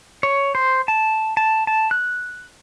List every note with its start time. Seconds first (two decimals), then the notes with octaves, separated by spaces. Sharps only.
0.23 C#5
0.55 C5
0.88 A5
1.37 A5
1.67 A5
1.91 F#6